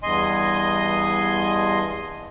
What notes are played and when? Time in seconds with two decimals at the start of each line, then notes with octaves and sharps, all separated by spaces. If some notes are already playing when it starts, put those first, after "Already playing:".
0.03 E2 G2 D#5 G#5 C6